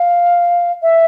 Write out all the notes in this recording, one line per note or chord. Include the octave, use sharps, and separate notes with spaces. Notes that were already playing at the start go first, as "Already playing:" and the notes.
Already playing: F5
E5